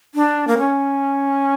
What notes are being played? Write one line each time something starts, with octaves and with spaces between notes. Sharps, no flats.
D4
A#3
C#4